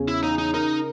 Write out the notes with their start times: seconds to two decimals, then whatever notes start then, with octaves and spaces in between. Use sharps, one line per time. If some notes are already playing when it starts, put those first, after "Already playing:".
Already playing: E2 C#3 C#4
0.08 E4
0.23 C#3 D#4
0.38 D#4
0.54 D#4 A#4